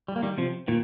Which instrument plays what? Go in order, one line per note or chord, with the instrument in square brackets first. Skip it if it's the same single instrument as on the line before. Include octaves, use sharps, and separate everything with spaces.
[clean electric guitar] G3
A#3
D#3 G3
C3 F3
A#2 D#3